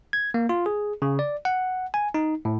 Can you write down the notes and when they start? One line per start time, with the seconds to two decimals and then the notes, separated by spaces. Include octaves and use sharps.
0.13 G#6
0.34 A#3
0.49 F4
0.66 G#4
1.02 C#3
1.19 D5
1.45 F#5
1.94 G#5
2.14 D#4
2.45 A2